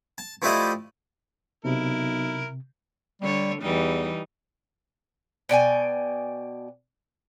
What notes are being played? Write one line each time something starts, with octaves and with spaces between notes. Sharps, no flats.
A5
F3 A3 E4 G4 D5 D#5
B1 C3 E4 A#4
D3 G3 C#5
E2 E3 G3 D#4
B2 D5 G5 G#5